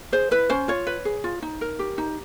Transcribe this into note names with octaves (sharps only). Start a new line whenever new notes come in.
G#4 C5
E4 B4
C#4 C5
F4 C#5
B4
G#4
F4
D#4
A#4
G4
D#4